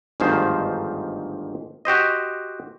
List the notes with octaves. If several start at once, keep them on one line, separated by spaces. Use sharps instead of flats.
G1 D2 G#2 D#3 F3 C5
F#4 G4 C5 D#5